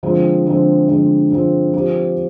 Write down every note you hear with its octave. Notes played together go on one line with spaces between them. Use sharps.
D3 F3 G#3 C4
D3 F3 G#3 C4
D3 F3 G#3 C4
D3 F3 G#3 C4
F3 C4 G4